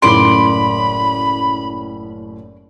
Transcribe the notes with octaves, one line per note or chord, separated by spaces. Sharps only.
F#1 F#2 A2 D5 B5 C6